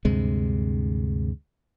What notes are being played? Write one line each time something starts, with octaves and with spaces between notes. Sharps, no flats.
D2 G2 C3 G#3